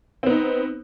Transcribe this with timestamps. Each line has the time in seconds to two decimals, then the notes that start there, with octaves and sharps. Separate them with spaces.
0.23 C4
0.26 B3
0.30 D#4